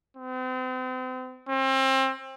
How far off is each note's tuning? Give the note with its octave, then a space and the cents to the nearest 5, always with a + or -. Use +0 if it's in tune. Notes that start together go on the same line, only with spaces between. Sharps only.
C4 -40
C4 +30